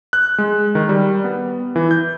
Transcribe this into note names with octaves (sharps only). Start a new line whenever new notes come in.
F#6
G#3
D#3
G3
B3
E3
G6